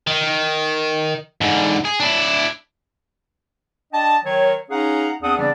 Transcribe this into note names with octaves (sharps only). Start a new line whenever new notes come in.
D#3
G#2 D3
G#4
D4 E4
D4 D#5 G5 A5
D#3 F#3 C#5
C#4 D#4 G#4 F5 F#5 A#5
E2 C4 D4 F#5 D#6
C#3 E3 G3 B3 C4 D4